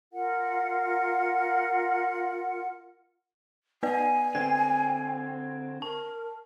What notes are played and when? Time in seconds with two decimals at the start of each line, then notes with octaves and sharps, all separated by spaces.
0.13 F4 A#4 F#5
3.83 B3 B4 D5 G#5
4.35 D3 C4 G#6
5.82 A#4 A5